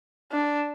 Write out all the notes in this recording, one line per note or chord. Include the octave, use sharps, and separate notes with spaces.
D4